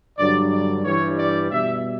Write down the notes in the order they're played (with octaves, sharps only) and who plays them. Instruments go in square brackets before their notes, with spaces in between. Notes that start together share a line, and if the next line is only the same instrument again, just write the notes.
[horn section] G2 D3 F#3 D5
D5
G2 E3 G3 C#5
D5
B2 G3 E5